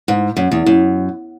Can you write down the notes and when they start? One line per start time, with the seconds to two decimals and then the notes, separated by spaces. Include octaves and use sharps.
0.08 G#2
0.37 F#2
0.52 E2
0.66 F#2